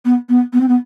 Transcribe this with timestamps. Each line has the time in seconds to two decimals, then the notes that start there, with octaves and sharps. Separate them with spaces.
0.05 B3
0.29 B3
0.53 B3
0.60 C4
0.68 B3